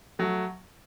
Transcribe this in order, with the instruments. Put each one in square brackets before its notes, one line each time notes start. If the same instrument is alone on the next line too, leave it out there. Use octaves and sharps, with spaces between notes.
[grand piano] F#3 A3